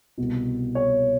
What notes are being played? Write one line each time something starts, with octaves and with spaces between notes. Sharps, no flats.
C2 B2
C#5